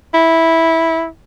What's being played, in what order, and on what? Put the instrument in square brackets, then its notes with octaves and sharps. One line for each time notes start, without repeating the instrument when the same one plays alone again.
[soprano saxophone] E4